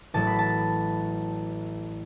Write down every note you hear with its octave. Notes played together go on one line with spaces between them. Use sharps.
A1 A2 F#3 A5
B5
A5